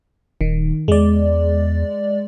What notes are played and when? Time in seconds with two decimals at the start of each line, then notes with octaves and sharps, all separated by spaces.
0.41 D#1 D#3
0.88 E2 G#3 D5